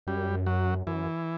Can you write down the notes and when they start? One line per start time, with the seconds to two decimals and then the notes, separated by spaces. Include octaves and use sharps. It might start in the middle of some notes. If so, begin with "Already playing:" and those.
0.07 F#2 G3
0.46 F#3
0.87 F#2 E3